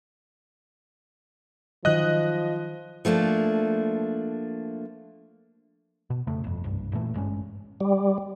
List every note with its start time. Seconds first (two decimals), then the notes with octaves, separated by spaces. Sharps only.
1.85 D#3 F3 F#3 D#5 F#6
3.05 F3 A3 A#3 D4
6.10 B2
6.27 F2 C#3 A3
6.44 G1 F2
6.64 F#1 C2 G2
6.92 G1 A#2 E3 A3
7.14 G#1 G2 G#3 C#4
7.80 G3